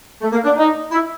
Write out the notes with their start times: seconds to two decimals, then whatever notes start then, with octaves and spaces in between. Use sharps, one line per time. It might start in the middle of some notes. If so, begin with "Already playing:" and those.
0.22 A3
0.33 A#3
0.44 D4
0.56 D#4
0.91 E4